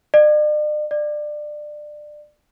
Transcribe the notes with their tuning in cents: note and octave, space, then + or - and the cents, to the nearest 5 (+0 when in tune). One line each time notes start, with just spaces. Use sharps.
D5 +45
D5 +25